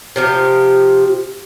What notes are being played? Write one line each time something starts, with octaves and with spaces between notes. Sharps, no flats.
C3 F3 G4